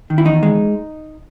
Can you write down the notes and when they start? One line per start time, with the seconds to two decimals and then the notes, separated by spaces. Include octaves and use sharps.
0.10 D#3
0.18 E4
0.25 E2 D#4
0.43 G#3